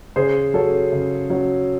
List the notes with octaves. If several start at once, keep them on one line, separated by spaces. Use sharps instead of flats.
C#3 G#4 C5
F#3 C#4 A4
C#3
F#3 C#4